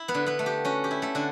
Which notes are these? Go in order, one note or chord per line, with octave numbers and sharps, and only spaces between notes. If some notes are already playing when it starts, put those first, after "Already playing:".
Already playing: E4
B3 B4
D3
B3 B4
A3
G4
C#4 F#4
G4
E4
A3 A4
D3 F#4